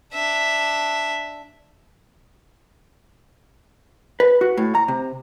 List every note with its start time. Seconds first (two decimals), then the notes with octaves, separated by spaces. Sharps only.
0.14 D4 E5
4.20 B4
4.41 F#4
4.57 A2
4.75 A#5
4.88 C3